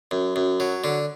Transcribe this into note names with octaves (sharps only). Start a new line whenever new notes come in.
F#2
F#2
F#3
D3